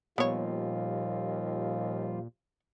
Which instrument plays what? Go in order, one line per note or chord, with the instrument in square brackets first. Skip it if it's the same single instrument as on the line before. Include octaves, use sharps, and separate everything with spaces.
[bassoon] D#2 [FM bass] A#2 [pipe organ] F3 G3 F4 [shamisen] B3 C#5